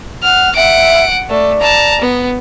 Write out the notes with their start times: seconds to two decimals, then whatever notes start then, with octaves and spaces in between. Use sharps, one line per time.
0.23 F#5 F6
0.56 E5 F#5 D7
1.29 A3 D5
1.62 A5 A#5
2.01 B3